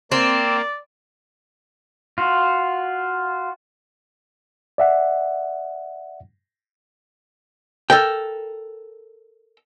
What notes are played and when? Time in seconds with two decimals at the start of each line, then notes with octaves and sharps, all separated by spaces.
0.12 A#3 C4 D5
2.18 F4 F#4
4.78 D5 E5 F#5
7.90 A4 A#4 G5